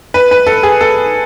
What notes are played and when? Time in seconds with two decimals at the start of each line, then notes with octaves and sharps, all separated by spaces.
0.14 B4
0.31 B4
0.47 A4
0.63 G#4
0.81 A4